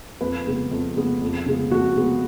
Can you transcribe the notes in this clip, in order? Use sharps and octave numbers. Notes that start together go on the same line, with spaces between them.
F2 B4
C#3 G#3 B3
F2
C#3 G#3 B3
F2
C#3 G#3 B3
F2 F#4
C#3 G#3 B3